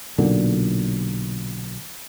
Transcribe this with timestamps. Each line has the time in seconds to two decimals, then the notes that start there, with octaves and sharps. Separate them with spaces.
0.18 B1 A#2 D3